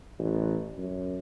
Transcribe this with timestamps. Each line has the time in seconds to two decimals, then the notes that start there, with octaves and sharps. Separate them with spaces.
0.19 A1
0.78 F#2